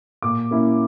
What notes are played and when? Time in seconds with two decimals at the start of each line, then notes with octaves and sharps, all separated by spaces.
0.22 A#2 D6
0.51 A#3 C#4 E4